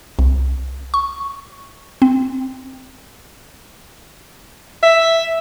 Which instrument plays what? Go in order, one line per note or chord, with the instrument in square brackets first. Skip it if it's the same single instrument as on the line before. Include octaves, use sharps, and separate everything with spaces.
[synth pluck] C2
C#6
C4
[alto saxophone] E5